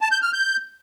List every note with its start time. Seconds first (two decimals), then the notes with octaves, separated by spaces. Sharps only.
0.01 A5
0.12 G6
0.22 F6
0.33 G6